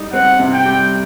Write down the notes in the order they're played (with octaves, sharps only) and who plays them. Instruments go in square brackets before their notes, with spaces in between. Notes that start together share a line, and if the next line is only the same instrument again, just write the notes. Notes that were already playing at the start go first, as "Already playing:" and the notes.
Already playing: [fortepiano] G3 D#4
[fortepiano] C4 [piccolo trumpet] F#5
[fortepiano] C3
[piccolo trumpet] G5
[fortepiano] G3